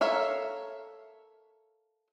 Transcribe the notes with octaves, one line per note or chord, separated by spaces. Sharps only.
A4 A#4 C#5 E5 F5